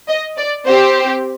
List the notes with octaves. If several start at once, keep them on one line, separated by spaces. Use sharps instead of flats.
D#5
D5
C4 G4 C5